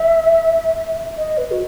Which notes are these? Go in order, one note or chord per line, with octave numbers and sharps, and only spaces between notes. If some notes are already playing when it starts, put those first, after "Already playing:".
Already playing: E5
D#5
B4
F#4